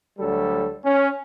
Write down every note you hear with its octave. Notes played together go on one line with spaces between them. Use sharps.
D2 F#3 G3 A4
C#4